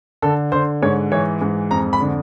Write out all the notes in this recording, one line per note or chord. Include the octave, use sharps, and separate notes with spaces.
D3 A4
D3 C5
G#2 C#5
E3 C#5
G#2
F2 A#5
B5
D3